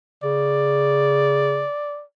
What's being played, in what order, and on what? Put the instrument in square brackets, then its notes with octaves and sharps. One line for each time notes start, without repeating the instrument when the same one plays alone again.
[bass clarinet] C#3 [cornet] D5